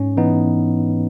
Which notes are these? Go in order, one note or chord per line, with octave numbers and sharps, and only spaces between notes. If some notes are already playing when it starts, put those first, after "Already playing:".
Already playing: G#2 C#4
E3 B3 D#4